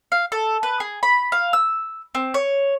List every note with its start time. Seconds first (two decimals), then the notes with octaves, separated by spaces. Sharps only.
0.12 F5
0.32 A4
0.63 B4
0.80 G#4
1.03 B5
1.32 F5
1.53 E6
2.15 C4
2.34 C#5